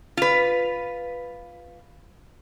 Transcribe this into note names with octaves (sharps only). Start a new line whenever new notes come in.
F4 B4